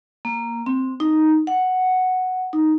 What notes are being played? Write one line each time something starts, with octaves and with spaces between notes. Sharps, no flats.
A#3
C4
D#4
F#5
D#4